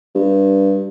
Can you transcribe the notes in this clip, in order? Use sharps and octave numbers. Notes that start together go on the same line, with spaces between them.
G2